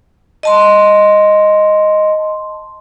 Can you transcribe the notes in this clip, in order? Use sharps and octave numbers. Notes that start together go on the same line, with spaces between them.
D#5 A5 C6